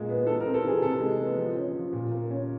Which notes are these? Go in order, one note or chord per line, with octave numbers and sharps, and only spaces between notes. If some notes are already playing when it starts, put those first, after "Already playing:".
Already playing: A#2 G#3 A#3
B3
E3 A4
A#4
C4
A4
E3 G#4
C3 A4
G#3
B3
F3
C#4
F3
A#2
A#3
C#4